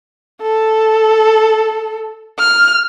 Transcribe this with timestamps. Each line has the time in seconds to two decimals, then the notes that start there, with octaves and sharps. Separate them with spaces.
0.42 A4
2.39 F6